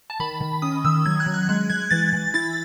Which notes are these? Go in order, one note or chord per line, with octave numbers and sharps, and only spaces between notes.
A5
D#3 B5
D#3
C#4 D#6
D#3 E6
F#3 G#6
F#6
F#3
F#6
G#3 F#6
G#3 G#6
E3 A6
E3
E4 A6